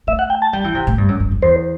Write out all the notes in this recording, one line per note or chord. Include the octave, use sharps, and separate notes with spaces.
A3 E5
F#5
G5
A5
G3 G5
E3
C3
A2
G2
F#2
F#2
F#2
E2 C5